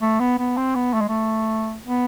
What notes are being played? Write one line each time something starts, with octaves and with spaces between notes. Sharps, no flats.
A3
B3
B3
C4
B3
A3
G#3
A3
B3